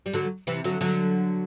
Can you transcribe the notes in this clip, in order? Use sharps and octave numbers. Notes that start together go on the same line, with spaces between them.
G3
D3 F#3
C3 E3
D3 F#3
D3 F#3